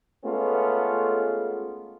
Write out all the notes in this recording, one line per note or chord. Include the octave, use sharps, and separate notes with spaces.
G#3 A3 B3 C#4 F4